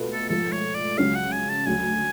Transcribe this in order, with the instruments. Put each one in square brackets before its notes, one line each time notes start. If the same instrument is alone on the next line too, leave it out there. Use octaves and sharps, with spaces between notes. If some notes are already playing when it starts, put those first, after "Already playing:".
Already playing: [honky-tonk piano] B2 A3 F4 B4
[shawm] A4
[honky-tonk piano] G#2 F3 A3 [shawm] A4
[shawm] C#5
D5
[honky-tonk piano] C#2 C#3 F#3 C#4 [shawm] F5
[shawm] F#5
G#5
A5
[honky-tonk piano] D2 D3 F#3 [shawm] G#5